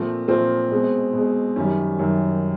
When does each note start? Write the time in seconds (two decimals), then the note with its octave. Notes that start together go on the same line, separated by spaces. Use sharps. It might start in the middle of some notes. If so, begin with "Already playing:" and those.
Already playing: A#2 F3 A3 C4
0.28 A#2 F3 A3 C4
0.71 B2 G#3
1.13 B2 G#3
1.56 F#2 D#3 G3 C#4
1.99 F#2 D#3 G3